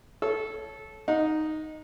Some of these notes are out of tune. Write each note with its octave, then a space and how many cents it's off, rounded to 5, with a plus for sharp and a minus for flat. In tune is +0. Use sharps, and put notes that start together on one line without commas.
A4 -15 C#5 +0
D#4 +0 F#5 -40